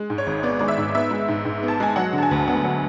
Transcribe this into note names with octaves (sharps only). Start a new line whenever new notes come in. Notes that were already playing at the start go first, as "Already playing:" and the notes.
Already playing: G#3
G#2
C#5
G#1
B3 D5
G#3 D5
E5
G#2
B3 E5
G#3
G#2
G#2
B3
A5
G#3 G#5
F#3 F#5
D3
A5
G#5
D2
B3 F#5
F#3